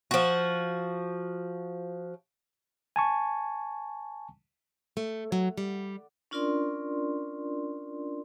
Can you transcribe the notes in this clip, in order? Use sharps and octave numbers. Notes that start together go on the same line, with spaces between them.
F3 F#4
G#5 A5 C#6
A3
F#3
G3
C#4 D4 F4 A#4 D5 C6